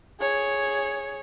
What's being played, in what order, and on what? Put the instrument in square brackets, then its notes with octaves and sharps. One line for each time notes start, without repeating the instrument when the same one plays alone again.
[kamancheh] G#4 C#5